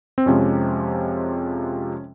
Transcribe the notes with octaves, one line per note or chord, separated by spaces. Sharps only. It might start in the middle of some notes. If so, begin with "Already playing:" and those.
C4
F2 C3 F3 G#3 C#4